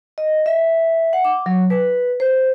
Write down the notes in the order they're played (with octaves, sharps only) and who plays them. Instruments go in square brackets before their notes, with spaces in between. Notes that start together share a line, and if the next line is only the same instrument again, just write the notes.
[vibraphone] D#5
E5
F#5
D6
F#3
B4
C5